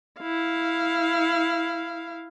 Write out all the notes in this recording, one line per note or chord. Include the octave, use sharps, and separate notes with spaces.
E4 F5